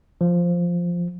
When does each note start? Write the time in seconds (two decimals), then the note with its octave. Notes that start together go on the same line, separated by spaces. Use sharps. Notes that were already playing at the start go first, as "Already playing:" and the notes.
0.21 F3